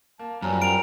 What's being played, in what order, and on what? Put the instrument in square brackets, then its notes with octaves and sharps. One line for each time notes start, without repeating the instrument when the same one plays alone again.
[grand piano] A#3 [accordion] A5
[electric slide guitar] F#2 [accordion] F3 G3 C#4 [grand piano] B3 A#4 A#5
[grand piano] A#4 F#5 G5 [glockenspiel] D7 F7